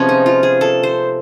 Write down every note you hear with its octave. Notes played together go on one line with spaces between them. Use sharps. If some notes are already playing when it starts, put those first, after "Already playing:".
Already playing: C3 F3 G#3 B3 C#4
D#4
F4
G#4
A4
C5